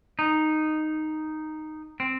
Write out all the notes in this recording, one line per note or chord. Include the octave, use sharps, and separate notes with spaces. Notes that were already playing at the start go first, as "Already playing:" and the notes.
D#4
C4